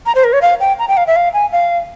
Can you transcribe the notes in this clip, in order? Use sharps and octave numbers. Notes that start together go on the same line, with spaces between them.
A#5
C5
A#4
C#5
F5
G5
A#5
G5
F5
E5
F5
G#5
F5